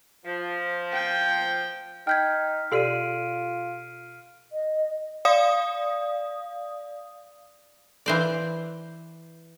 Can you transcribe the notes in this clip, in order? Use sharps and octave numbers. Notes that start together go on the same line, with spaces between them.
F3
G5
D#4 G5 F6 G6 G#6 B6
B2 F4 G4 A4 D5 C7 D7 D#7
D#5
D5 F5 D#6
E3 C5 D5